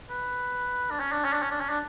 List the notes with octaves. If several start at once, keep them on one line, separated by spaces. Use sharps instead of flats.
B4
D4
C#4
D4
C#4
D4
C#4
D4
C#4
D4